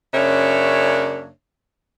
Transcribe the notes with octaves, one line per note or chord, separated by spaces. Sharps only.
F#2 C#3 A#3 D4 C#5 E5